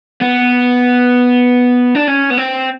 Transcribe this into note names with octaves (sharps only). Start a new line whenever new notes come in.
B3
D4
C#4
B3
C4